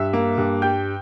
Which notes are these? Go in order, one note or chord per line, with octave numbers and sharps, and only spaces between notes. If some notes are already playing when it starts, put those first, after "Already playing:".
Already playing: G2 E5 E6
A#3
G2
G3 G5 G6